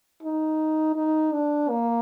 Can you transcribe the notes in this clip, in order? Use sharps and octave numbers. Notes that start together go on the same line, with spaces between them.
D#4
D#4
D4
A#3